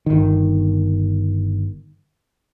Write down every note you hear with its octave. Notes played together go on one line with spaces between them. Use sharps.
G1 D#3